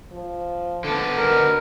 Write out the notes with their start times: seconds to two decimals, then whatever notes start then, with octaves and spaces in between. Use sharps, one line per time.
0.12 F3
0.84 D3 B3 A4
1.17 B2 A#4